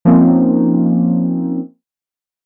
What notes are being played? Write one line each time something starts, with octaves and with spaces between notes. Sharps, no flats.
F3 A#3 C4 C#4 D#4